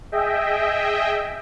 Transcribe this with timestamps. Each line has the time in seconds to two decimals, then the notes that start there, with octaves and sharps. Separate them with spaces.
0.12 G#4 D#5 E5 G5